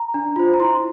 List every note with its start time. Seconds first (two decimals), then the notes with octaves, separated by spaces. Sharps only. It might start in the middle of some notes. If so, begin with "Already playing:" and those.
Already playing: A#5
0.14 D4
0.36 F4 C5
0.54 A#5
0.60 E4 C6